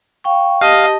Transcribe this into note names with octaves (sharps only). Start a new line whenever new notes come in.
F5 G5 C#6
G4 D#5 F5 A5